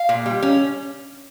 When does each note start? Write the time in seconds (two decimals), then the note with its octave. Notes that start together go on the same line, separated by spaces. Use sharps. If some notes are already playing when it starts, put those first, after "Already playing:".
Already playing: F5
0.09 A#2
0.26 G3
0.43 C#4